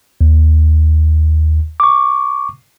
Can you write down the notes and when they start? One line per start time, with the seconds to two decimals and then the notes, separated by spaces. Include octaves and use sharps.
0.21 D#2
1.80 C#6 D6